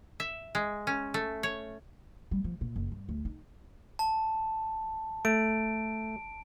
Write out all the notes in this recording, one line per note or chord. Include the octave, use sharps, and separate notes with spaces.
E5
G#3
C#4
A3
C#5
G3
F3
A#2
F#1
G2
D2
D#4
A5
A3 D7